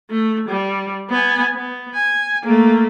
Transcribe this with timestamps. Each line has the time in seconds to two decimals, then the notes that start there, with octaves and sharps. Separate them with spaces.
0.11 A3
0.49 G3
1.10 B3 G#5
1.55 B3
1.95 G#5
2.44 A3 A#3